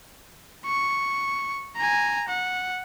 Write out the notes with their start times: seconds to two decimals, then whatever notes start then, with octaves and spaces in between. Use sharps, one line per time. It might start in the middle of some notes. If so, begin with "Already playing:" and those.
0.65 C#6
1.76 G#5 A#5
2.28 F#5